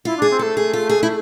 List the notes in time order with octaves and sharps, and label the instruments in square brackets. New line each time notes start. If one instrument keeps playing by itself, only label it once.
[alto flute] E4 [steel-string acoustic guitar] F4
[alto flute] D4 [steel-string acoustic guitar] G#4
[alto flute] C4
[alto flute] A3 [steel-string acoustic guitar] A4
[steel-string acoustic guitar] G#4
F4
G#4
E4